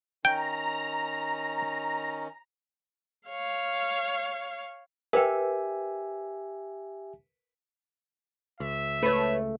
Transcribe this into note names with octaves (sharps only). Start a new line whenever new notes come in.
D#3 C#4 G5 A#5
C#5 F5
G4 A#4 B4 E5 G5 G#5
C#2 E5
A3 B4 C#5